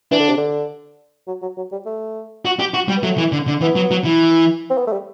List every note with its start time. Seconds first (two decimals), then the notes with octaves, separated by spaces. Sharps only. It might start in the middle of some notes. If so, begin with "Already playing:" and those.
0.11 E3 D4
0.20 D3
0.29 C3
0.37 D3
1.27 F#3
1.42 F#3
1.57 F#3
1.72 G3
1.86 A3
2.45 F#4
2.59 G4
2.74 F#4
2.88 G3
2.97 B3
3.03 F#3 A3
3.18 E3
3.32 D3
3.47 D3
3.61 E3 B3
3.76 F#3
3.91 F#3
4.04 E3
4.70 C4
4.77 B3
4.87 A3
4.93 G3